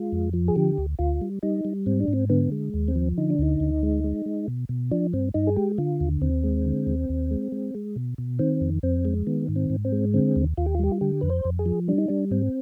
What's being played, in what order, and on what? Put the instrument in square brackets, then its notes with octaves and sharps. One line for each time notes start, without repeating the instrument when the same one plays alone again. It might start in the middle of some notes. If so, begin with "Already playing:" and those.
Already playing: [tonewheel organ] G#3 F4
F2
F3
G#4
D3 G4
D2
D2 F4
G3
G3 D#4
G3
G#2 C4
D4
G#2
C4
D3 B3
G#3
D#2
C4
F3
D3 D#4
D4
D2 D#4
D2
G#3
G#3
G#3
B2
B2
F3 D4
G2 C4
G2 D#4
G#4
G#3 G4
D3 F4
D#2
D#2 C4
G#3
D3
D#2
D#2
G#3
G#3
G#3
B2
B2
D#3 C4
F2
F2 C4
G#3
D#3 B3
G#2
C4
G#2
C4
G#3
D3 C4
D#2
D#2 F4
G4
F4
G3 G4
F4
D3 G4
F2 B4
C5
F2
G#4
F3
G3 D4
D#4
G3 D4
G#2 C4